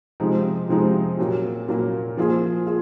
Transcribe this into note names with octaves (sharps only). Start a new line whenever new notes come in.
C3 F3 G#3 D#4
C3 F3 G#3 D#4
A#2 F#3 A#3
A#2 F#3 A#3
F3 A#3 F4 G#4
F4 G#4